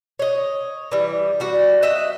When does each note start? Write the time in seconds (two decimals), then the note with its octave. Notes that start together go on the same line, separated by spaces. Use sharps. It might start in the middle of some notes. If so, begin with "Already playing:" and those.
0.19 C#5 D#5
0.92 E3 G3
1.40 G3 F#4
1.82 D#5 E5 F#5 G5